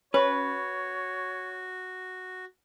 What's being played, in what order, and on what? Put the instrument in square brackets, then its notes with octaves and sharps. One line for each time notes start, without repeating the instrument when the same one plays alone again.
[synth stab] C#4 [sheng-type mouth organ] F#4 [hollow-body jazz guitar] B4 [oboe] C#5